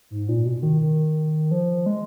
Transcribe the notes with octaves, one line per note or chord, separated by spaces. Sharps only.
G#2
A#2
B2
D#3
D#3
F3
G#3